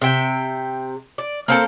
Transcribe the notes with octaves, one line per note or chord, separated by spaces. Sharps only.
C3 E5 G5
D5
A#3 C4 A4 A#4